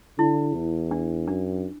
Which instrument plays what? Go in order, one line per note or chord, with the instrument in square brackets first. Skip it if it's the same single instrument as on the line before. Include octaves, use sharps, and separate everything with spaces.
[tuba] D3 [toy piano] E4
[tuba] E2
[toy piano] D4
[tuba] F#2 [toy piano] D4